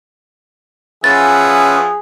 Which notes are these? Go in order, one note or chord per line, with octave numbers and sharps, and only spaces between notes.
F3 C#4 G#4 B4 E5 F#5 A6